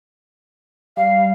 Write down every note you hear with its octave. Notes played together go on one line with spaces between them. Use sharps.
G3 F5